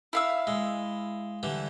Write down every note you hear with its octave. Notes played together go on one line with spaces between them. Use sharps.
E4 F5 E6
G#3
D3 E3 G3